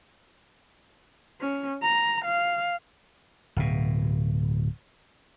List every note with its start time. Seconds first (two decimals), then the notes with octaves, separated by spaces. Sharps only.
1.41 C#4
1.82 A#5
2.25 F5
3.56 D1 B2